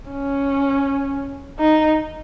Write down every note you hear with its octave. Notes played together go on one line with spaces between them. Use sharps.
C#4
D#4